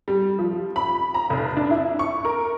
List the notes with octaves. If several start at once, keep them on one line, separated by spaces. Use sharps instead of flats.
G3
F3
B5
A#5
F1
D4
E4
C#6
A#4